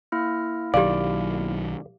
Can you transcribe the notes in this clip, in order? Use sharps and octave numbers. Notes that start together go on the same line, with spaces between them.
A#3 E4 F6
B1 D#3 F#3 G4 D5 F5